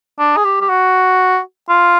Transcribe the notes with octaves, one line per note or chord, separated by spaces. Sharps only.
D4
G#4
G4
G4
F#4
F4